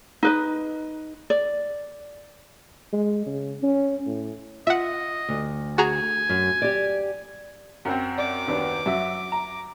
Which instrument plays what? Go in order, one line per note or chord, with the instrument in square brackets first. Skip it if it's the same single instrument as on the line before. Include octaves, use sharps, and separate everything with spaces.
[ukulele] D#4 B4 D#5
D5
[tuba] G#3
C#3
C#4
A2
[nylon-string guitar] F4 [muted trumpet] D#5 [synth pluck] E5 F#5
[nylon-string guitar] D2
[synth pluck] F#4 G#4 A#5 [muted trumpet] G#5
[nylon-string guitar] F#2
G4 D5
[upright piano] F#2 C4
[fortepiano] D5 [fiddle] D6
[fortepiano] D#2 B3 D4
[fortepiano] F#2 F#4 [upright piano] E5
[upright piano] A#5